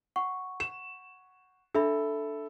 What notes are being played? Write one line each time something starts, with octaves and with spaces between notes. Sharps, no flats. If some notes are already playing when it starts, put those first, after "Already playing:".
F#5 C#6
E7
D4 A4 E5 B5